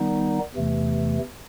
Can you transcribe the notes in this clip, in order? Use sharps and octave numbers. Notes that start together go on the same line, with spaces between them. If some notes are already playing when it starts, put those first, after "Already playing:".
Already playing: D#3 G3 B3 D#4
E2 C3 E3 A3